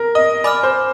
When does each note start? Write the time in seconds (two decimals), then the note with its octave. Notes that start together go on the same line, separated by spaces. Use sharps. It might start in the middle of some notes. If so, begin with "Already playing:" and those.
Already playing: A#4
0.15 D#5
0.44 D5 G#5 B5 D6 F6
0.63 C5